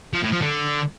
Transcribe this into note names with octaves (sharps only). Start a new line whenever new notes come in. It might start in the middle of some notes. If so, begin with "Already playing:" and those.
F3
A2
F3
D3